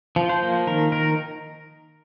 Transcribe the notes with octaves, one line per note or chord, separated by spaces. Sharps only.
F3
C5
A#3
D#3 A#4
D#3 A#4